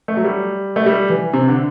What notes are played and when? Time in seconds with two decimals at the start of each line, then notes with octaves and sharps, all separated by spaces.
0.08 A3
0.17 F#3
0.24 G3
0.76 A3
0.86 G3
1.10 E3
1.34 C3
1.48 D3